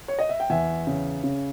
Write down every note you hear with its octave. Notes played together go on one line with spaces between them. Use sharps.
C#5
D#5
E5
G5
E2 E5 G#5
C#3
C#3